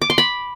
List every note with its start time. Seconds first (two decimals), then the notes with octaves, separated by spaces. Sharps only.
0.02 D6
0.10 C6
0.18 B5